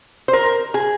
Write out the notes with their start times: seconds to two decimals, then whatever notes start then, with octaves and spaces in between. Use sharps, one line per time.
0.28 C5
0.33 A#4
0.74 G#4